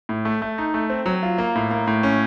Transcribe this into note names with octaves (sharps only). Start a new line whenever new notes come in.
A2
A3
A3
D#4
A3
C4
F#3
F4
A#3
A2
A#3
A2
C#4